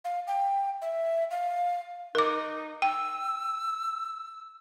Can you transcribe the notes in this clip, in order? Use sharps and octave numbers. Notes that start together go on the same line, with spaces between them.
F5
G5
E5
F5
D#4 A#4 D6
G5 E6